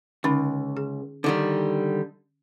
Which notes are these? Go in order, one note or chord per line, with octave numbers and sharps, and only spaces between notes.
C#2 D3 C#4 D#4
G#4
D3 D#3 G3